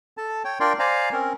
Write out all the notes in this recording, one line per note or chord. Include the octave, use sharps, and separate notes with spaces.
A4 A5
C#5 G5
D4 F4 A#4 D5 G5 C6
C5 D5 F5 G#5 A#5
C4 C#4 A#4